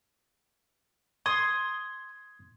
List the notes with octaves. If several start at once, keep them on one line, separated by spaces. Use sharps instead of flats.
C6 D#6 G#6